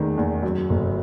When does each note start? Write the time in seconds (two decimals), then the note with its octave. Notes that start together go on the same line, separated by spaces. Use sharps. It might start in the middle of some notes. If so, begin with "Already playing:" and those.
Already playing: E2 D#3 A3
0.18 E2
0.43 F#2
0.70 G1